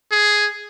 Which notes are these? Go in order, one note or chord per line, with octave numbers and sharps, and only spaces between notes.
G#4